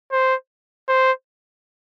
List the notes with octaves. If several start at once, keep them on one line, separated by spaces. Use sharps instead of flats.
C5
C5